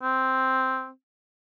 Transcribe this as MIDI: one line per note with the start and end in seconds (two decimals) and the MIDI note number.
0.02 0.90 60